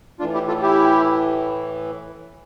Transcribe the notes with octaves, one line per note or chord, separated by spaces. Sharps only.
A2 E3 D4 F4
E4 G4
F4 A4
E4 G4